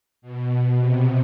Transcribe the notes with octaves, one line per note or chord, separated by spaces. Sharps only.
B2
C3